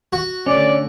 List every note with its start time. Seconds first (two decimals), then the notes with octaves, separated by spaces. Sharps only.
0.13 F#4
0.46 D3 A3 C#4 D5